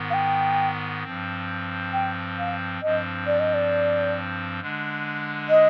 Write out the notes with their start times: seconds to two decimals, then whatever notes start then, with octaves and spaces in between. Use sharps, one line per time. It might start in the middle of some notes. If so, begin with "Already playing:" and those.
Already playing: G#2 D#3 B3
0.10 F5
0.14 G5
1.03 G2 F3 C4
1.93 G5
2.38 F5
2.82 G2 F3 C4 D#5
3.27 D5
3.40 D#5
3.54 D5
4.60 D3 G#3 D4
5.49 D#5